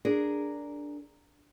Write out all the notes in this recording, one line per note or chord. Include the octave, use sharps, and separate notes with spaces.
D4 G#4 A#4